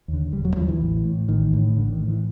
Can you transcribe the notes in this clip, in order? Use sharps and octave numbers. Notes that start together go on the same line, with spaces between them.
D#2
D3
E1 G3
F#3
D#2 D3 F3
E3
A1
A2
A1 D#3
A2
D#3
A1 D3
D#3
A2
E3